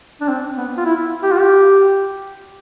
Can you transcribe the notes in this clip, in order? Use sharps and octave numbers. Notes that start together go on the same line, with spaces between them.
D4
C4
B3
F4
E4
G4
F4
G4